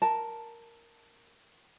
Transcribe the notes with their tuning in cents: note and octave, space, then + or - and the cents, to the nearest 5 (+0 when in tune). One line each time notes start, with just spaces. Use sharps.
A#4 +0 A5 +0